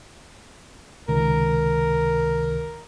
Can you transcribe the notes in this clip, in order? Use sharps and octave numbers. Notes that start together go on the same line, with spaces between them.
C#2 C3 D#3 A#4